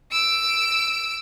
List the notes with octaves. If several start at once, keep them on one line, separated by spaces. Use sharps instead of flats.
E6 D7